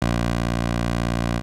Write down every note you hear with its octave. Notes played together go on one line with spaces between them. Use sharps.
A#1